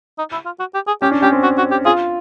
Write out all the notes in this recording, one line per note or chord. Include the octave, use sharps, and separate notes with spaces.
D#4
E4
F4
F#4
G4
G#4
C#4 G4
D4
C#4 G4
C4
F#4
F#4
G4
F4 G#4